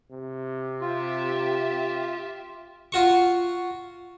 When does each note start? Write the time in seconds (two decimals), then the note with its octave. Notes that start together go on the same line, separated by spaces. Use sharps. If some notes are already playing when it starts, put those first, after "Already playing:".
0.11 C3
0.81 F4 G4 E5
2.92 F4 F#4 C#6